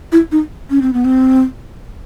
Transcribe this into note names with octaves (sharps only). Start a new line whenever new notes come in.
E4
D#4
C#4
C4
B3
C4